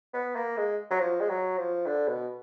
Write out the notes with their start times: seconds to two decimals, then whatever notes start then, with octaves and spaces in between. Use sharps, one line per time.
0.14 B3
0.35 A#3
0.57 G#3
0.91 F#3
1.00 F3
1.20 G#3
1.29 F#3
1.58 F3
1.86 D3
2.08 B2